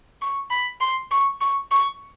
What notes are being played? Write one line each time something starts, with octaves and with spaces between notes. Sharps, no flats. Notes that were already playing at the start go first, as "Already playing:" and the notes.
C#6
B5
C6
C#6
C#6
C#6